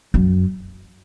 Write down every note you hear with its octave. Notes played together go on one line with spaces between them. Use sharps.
F#2